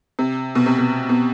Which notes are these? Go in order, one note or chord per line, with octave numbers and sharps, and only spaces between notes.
C3
B2
C3
B2
B2